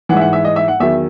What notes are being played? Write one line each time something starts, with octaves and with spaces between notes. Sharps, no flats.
G#2 E3 E5 F#5
F#5
E5
D#5
E5
F#5
E2 D#3 F#3 E5